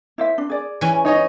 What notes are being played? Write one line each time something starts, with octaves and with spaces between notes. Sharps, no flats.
E4 C5 E5
D4
G#4 D5
E3 C#4
D#4 C#5 D#5